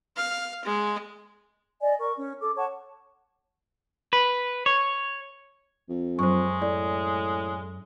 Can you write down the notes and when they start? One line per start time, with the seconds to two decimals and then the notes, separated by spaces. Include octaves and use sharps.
0.16 F5
0.65 G#3
1.81 D5 D#5 G#5
1.99 A#4 C#6
2.17 C#4
2.41 A4 D6
2.56 C#5 F#5 A5 C#6
4.13 B4
4.66 C#5
5.89 F2
6.19 F#2 G#3 C5 C#6
6.62 A2 D5